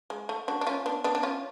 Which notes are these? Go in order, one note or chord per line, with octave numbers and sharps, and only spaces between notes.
G#3
A3
D4 F#4
D4
C#4 F4
B3 D4
B3 D4
D4
C#4 F4